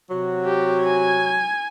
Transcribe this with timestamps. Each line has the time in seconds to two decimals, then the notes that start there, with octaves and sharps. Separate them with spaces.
0.10 C3 F#3 F#4
0.45 G4
0.83 G#5 G#6